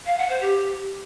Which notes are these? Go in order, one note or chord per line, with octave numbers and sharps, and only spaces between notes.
F5
F#5
C5
G4